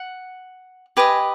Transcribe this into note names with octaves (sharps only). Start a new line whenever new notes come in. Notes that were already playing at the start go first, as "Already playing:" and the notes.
Already playing: F#5
G4 B4 D#5 G#5